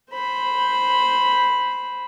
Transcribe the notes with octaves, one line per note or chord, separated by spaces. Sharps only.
C5 B5